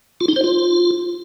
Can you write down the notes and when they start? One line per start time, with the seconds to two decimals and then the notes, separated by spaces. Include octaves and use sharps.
0.21 F4
0.28 D#4
0.36 C5
0.44 F4